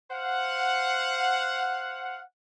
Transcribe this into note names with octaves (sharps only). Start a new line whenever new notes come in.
C5 F5 F#5